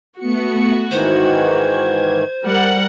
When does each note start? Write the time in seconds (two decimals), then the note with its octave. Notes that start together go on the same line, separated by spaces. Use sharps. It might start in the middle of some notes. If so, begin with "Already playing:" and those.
0.19 A3 B3 F#4 C#7
0.91 G#2 D#3 E3 C5 G#6
2.44 G3 A#4 F#5